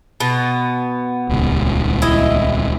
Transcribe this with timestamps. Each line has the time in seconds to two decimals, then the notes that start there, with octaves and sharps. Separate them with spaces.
0.20 B2 B3
1.29 D#1 C#2
2.02 E4 D#5